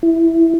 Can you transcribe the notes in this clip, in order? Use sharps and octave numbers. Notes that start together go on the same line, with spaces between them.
E4